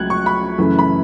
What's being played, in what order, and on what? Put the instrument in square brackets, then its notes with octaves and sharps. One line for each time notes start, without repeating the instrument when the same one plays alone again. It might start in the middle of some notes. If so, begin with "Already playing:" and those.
Already playing: [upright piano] C#2 C#3 F#3 A3 F#6 G#6
C#6
B5
F#2 C#3 E3 A3
B5